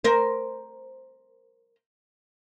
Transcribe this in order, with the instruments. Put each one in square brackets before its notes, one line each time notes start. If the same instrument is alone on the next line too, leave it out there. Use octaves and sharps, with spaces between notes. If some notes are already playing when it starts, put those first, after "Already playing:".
[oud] A#4 C5